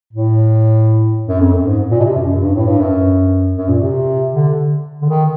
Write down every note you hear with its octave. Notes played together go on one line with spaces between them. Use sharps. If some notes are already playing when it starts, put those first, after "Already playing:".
A2
F#2
F2
F#2
G#2
A#2
B2
C3
F#2
F#2
G2
A2
G2
F#2
F#2
A#2
C3
D3
D3
D#3